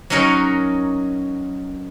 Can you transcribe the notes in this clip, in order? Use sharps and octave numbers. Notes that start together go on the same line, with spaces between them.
F#3 C#4 D#4 A#4 C#5